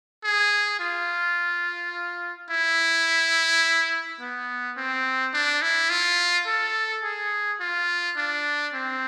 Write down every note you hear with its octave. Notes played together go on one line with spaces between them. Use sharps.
G#4
F4
E4
B3
C4
D4
E4
F4
A4
G#4
F4
D4
C4